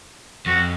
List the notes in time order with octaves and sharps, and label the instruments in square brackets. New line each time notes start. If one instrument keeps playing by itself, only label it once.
[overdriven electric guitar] F2 [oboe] F#4